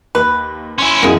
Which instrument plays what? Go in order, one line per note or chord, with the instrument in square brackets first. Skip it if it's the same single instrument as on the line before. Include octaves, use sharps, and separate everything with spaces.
[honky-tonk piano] D#2 [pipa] B4
[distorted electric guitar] C#4 E4 [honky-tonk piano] G#5 C6
[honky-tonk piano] B1 F#2 E3 [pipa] A#3 G#4